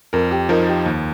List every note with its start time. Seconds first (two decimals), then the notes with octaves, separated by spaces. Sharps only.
0.13 F2 A#4
0.31 G4
0.49 F3 D#4 A#4
0.68 G4
0.86 D#2